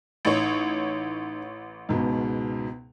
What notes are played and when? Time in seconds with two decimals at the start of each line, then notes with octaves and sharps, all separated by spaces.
0.25 A1 D#4 C#5
1.89 C#2 G#2 B2